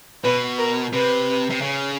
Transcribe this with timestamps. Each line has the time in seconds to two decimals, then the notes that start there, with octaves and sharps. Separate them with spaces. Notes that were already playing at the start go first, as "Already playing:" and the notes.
0.24 B2 B4
0.59 A#4
0.93 C3 B4
1.50 C3
1.62 C#3